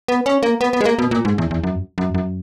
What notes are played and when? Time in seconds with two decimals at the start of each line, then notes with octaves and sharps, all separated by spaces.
0.08 B3
0.26 C#4
0.43 A#3
0.61 B3
0.73 B3
0.81 G#3
0.85 A#3
0.99 B2
1.11 A#2
1.25 G#2
1.38 E2
1.51 E2
1.63 F#2
1.98 F#2
2.14 F#2